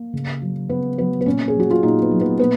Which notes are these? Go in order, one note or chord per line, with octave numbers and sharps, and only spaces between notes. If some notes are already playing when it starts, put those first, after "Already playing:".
Already playing: A#3
C#3
F#3
C#3 B3
F#3 B3
B3
A#2 C#4
G#4
F#3
F#4
F4
A#2 D#4
B3
F#3
B3
A#2 B3